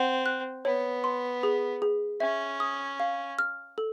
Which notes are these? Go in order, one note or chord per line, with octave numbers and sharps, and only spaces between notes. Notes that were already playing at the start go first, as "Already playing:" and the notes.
Already playing: C4 F#5
F#6
B3 C#5
C6
G#4
G#4
C#4 E5
D#6
F5
F6
A4